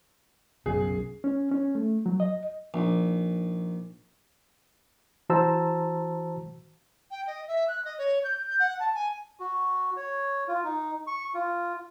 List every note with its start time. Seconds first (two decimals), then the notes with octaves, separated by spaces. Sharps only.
0.66 B1 F#2 C#3 G#4
1.24 C#4
1.52 C#4
1.75 A3
2.06 F#3
2.20 D#5
2.74 A#1 F3 D#4
5.30 E3 F#4 C5 A5 A#5 E6
7.11 G5
7.27 D#5
7.47 E5
7.68 F#6
7.85 D#5
7.98 C#5
8.24 G6
8.47 G6
8.60 F#5
8.79 A5
8.94 G#5
9.39 F#4
9.97 C#5
10.48 F4
10.64 D#4
11.07 C#6
11.34 F4